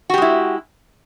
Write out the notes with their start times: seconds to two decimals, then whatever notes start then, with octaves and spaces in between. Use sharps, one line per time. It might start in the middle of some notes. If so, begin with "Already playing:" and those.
0.10 F#4
0.14 G4
0.18 G#3
0.22 E4